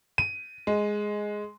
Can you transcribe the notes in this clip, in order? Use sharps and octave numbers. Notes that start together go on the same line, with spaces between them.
D#7
G#3